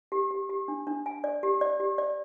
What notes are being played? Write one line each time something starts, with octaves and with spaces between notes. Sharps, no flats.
G4
G4
G4
D4
D4
G#5
D5
G4
D5
G4
D5